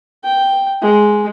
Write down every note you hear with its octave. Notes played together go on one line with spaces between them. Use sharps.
G5
G#3